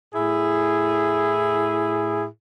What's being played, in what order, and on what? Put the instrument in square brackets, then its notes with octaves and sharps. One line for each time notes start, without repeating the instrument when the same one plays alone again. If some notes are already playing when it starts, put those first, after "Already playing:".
[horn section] A2 E4 G#4